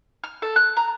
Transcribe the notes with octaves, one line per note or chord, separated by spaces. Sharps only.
F6
A4
F#6
A#5